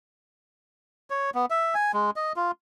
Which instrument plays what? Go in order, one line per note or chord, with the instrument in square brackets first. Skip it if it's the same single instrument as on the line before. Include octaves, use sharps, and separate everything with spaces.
[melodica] C#5
B3
E5
G#5
G#3
D#5
F4